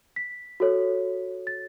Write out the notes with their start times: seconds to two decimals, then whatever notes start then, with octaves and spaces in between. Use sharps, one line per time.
0.16 B6
0.60 F#4 A4 C#5
1.47 A6